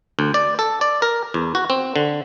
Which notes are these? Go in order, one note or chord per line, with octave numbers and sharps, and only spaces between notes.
D2
D5
A4
D5
A#4
E2
F#4
C4
D3